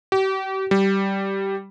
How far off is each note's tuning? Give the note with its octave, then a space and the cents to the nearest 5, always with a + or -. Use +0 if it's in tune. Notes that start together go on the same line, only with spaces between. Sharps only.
G4 -40
G3 -10